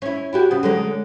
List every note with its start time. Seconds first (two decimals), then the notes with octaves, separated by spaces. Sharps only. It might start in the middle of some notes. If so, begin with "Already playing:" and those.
0.02 C#4 E4
0.33 E4 F#4 G4
0.51 C#3 B3
0.63 D3 F#3 G#3